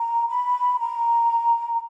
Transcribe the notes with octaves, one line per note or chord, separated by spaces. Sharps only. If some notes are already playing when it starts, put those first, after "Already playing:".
Already playing: A#5
B5
A#5